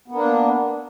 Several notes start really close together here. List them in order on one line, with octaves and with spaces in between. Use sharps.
B3 A#3 D4